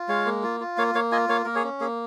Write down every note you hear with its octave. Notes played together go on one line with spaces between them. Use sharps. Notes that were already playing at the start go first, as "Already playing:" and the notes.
Already playing: F4
G#3 C#5 F5
A#3
F4
F4
A#3 C#5 F5
A#3 C#5 F5
F4 D#5 G#5
A#3 C#5 F5
A#3 A#4
G#4 C#5
C#4
A#3 G#4